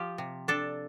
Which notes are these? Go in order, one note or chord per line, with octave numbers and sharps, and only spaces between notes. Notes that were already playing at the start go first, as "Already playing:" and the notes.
Already playing: F3 F4 G4
C3
D4 A4